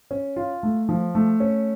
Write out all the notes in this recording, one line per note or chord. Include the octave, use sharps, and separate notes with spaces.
C#4
F4
A3
F3
A3
C#4